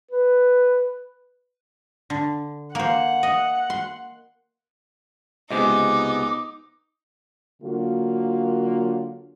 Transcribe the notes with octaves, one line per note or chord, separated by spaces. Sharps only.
B4
D3
A#3 C5 F#5
D#5
C6
C#2 C3 G#3 B3 D#4 D#5 D6
D3 F#3 A#3 F4 F#4